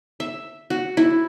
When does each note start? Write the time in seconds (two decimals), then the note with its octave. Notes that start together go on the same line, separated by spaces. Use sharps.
0.20 E5
0.70 F#4
0.97 E4